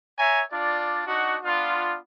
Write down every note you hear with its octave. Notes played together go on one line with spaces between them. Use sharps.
C#5 E5 G#5 A#5
D4 F4 D5
D4 D#4 F#4
B3 D4 F4